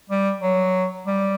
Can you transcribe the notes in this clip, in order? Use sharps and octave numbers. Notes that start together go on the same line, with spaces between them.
G3
F#3
G3